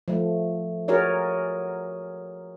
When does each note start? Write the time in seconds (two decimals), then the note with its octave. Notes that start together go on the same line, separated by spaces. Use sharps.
0.08 F3 A3
0.88 F#4 G#4 A#4 C#5 D5